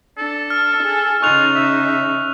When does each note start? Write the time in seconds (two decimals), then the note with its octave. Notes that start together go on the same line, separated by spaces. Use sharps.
0.18 D4 A4
0.50 F6
0.82 G#4
1.22 C#3 D#4 F4 C#6 F#6 F7
1.56 E5